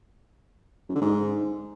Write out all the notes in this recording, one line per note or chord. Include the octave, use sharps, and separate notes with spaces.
F#2
D3
G#2